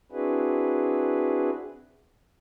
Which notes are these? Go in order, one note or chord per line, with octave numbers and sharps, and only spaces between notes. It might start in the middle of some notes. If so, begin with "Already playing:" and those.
C4 D4 E4 F#4 G#4 B4